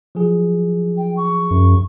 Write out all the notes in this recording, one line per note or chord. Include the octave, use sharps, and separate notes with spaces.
F3 F#3 G#4
G5
C#6
F#2